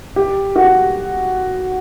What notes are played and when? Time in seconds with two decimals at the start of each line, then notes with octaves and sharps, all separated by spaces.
0.16 G4
0.56 F#4
0.63 G4